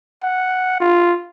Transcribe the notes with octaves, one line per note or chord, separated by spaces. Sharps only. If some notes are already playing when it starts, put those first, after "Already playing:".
F#5
F4